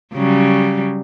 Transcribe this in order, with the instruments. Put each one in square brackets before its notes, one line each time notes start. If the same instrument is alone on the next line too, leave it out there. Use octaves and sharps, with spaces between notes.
[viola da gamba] C#3 F#3 G3